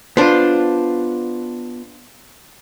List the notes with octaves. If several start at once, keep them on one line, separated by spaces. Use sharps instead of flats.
B3 D4 F4 C5